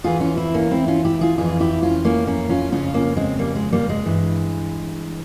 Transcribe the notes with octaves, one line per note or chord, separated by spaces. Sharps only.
E2 E3 F4 G#4
C#4 F4
C4 E4
A#3 C#4
C4 E4
C#4 F4
E4 G4
F4 G#4
F2 E3 F4 G#4
E4 G4
C#4 F4
A#3 C#4
A#3 C#4
C#4 F4
F2 C#3 F3 C#4 F4
A#3 C#4
G#3 C4
G3 A#3
G#3
G3 A#3
G#3
G2 E3